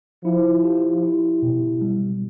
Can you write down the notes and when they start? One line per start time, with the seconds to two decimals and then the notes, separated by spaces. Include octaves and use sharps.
0.24 F3 E4
0.64 G4
1.03 E4
1.42 B2
1.82 G3